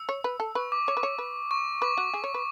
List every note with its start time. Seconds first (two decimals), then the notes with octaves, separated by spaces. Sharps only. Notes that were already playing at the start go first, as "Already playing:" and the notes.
Already playing: E6
0.09 C#5
0.24 B4
0.40 A4
0.55 B4 C#6
0.72 D6
0.87 C#5 D6
0.97 B4
1.03 C#5
1.18 B4
1.51 C#6
1.82 B4 D6
1.98 F#4
2.14 G#4
2.24 C#5
2.34 B4